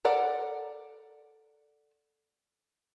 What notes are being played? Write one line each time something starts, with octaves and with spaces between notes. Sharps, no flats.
A4 A#4 D5 F#5